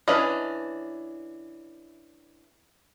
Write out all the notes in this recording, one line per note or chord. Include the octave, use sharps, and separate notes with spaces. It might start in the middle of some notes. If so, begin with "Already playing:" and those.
E3 C#4 D4 B4 D#5